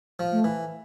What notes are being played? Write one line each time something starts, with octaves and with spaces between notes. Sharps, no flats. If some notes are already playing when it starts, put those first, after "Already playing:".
F3
A3
E3